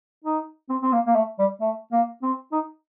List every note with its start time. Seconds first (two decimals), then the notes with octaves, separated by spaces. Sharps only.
0.24 D#4
0.69 C4
0.83 C4
0.93 A#3
1.07 A#3
1.16 A3
1.39 G3
1.61 A3
1.92 A#3
2.23 C4
2.52 D#4